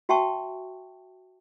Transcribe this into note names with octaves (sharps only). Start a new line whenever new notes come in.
F#4 E5 G5 A5 C#6